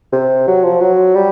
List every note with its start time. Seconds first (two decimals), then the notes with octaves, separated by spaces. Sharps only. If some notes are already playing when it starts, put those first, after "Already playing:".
0.13 C3
0.48 F#3
0.64 F3
0.81 F#3
1.15 G3